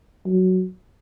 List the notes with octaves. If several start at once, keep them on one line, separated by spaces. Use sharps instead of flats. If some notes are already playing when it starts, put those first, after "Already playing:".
F#3